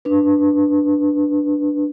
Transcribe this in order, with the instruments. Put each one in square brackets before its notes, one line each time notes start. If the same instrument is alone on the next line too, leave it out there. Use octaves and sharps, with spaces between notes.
[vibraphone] D4 B4